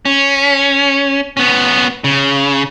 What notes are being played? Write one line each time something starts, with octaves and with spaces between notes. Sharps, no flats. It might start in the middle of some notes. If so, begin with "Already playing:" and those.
C#4
B3 C#4
C#3